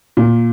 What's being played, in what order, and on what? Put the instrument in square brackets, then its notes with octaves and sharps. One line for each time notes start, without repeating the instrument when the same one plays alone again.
[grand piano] A#2